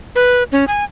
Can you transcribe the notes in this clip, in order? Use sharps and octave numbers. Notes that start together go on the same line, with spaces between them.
B4
C#4
G#5